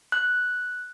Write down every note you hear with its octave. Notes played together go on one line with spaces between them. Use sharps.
F#6